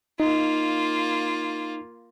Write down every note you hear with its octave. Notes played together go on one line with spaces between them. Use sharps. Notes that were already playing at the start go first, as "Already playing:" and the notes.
A#3 D#4 F4